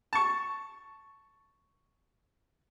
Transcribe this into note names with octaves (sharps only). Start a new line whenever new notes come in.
A5 C#6